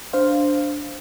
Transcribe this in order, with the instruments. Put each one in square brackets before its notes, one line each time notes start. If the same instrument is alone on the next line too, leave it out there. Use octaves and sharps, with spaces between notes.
[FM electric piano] D4 C5 F5